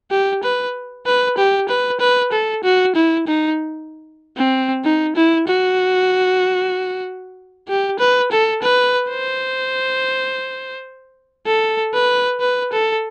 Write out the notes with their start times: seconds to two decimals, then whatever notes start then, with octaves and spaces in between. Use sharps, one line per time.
0.11 G4
0.43 B4
1.06 B4
1.38 G4
1.69 B4
2.00 B4
2.32 A4
2.63 F#4
2.95 E4
3.27 D#4
4.37 C4
4.84 D#4
5.15 E4
5.47 F#4
7.68 G4
7.99 B4
8.31 A4
8.62 B4
9.10 C5
11.46 A4
11.93 B4
12.41 B4
12.72 A4